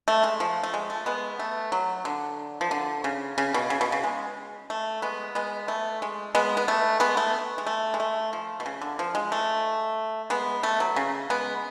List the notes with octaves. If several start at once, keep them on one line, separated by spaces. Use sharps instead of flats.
A3
G#3
F3
A3
G#3
A3
G#3 B3
A3
F#3
D3
F3
D3
C#3
C#3
B2
C#3
B2
C#3
G#3
A3
G#3 B3
G#3 B3
A3
G#3
G#3 B3
B3
A3
G#3 B3
A3
G#3
A3
G#3
A3
F3
B2
C#3
D3
F3
G#3
A3
G#3 B3
A3
F#3
C#3
G#3 B3